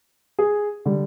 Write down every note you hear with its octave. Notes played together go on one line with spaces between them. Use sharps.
G#4
D3 G3